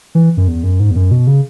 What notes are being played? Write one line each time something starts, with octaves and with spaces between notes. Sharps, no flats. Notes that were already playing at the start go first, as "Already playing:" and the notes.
E3
F#2
E2
F#2
G#2
E2
F#2
B2
C#3